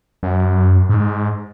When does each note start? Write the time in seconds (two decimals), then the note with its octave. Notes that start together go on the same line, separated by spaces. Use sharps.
0.23 F#2
0.89 G#2